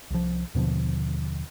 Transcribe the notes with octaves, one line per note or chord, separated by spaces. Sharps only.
C2 F3
D#2 B2 D3 F3